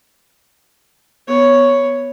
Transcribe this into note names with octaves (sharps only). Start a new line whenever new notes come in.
B3 C#5